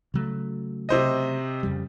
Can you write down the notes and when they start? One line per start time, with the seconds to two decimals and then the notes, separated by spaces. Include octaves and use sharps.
0.14 C#3 F#3 A3
0.89 C3 C5 D#5
1.63 F2 C#3 G3